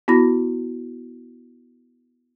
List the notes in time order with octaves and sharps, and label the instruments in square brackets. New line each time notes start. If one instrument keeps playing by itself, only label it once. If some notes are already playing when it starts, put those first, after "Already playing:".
[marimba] B3 E4 F#4 B5 A#6